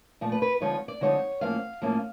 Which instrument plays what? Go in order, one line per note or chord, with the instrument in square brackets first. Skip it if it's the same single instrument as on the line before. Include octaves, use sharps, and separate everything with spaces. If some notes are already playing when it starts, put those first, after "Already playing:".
[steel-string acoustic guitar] A#2 F3 A3
B4
B4
D3 F3 G#3 C4 D#4 C#5
D5
D3 F3 G#3 C4 D#4 C#5
A2 F3 A#3 C#4 F5
A2 F3 A#3 C#4